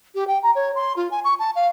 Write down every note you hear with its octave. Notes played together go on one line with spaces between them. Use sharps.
G4
G5
A#5
C#5
C6
F4
G#5
C#6
A5
F5